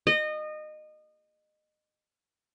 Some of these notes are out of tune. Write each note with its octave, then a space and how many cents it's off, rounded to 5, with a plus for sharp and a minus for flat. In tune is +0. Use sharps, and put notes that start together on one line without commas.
D#5 -25